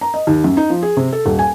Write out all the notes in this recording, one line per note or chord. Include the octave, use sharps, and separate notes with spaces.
A#5
D#5
D#2
F#2
D#4
F3
G#4
C3
A4
D#1
G#5